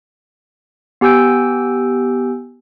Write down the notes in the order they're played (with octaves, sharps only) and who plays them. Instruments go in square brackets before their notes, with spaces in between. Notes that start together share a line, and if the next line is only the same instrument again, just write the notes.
[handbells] B3 G4 G#5 E6 G6 D7